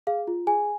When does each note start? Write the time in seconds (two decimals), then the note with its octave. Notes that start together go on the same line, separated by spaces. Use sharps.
0.07 G#4 F5
0.27 F4
0.47 G#4 G#5